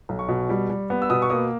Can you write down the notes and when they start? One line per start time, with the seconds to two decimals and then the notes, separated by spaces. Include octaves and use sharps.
0.09 B1
0.19 C#6
0.29 B2
0.49 G3
0.70 G3
0.90 B3
1.02 E6
1.10 B2 D#6
1.22 C#6
1.30 A#3 D#6